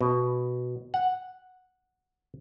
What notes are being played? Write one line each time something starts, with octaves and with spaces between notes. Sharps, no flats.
B2
F#5